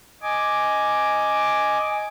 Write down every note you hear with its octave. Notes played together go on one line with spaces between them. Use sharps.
D#5 G#5 D6